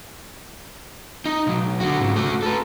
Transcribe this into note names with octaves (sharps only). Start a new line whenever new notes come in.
D#4
B1 F#3
D3 F#4
G#2 C#3
A3 F#4
A4 B4